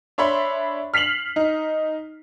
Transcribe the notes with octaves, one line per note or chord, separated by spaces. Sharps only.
D4 C#5 E5 B5 C6
F6 B6 C7 F7 F#7
D#4